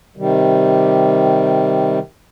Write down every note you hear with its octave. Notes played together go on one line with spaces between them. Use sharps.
C3 D#3 G3